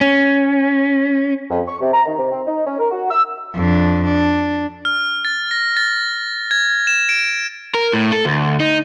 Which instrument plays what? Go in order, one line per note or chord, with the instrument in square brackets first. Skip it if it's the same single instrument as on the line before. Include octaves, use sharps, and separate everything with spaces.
[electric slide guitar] C#4
[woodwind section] F2
C#6
C3
A#5
D#3
C3
C4
D#4
C#4
A#4
F#4
E6
[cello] F2 D4
D4
[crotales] F6
A6
A#6
A6
G#6
E7
D7
[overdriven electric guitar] A#4
A2
A4
D2
D#4